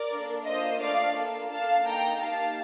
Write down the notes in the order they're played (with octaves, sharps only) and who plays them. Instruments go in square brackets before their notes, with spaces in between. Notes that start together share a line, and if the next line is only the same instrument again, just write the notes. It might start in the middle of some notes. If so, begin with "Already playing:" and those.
Already playing: [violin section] A#4 D5
A#3 D4 A4
A#3 D4 F4 C5 D#5
A3 D4 F4 D5 F5
A#3 F4 A4
D4 A4 F5 A5
A#3 D#4 A4 G5 A#5
A#3 D#4 G4 F5 A5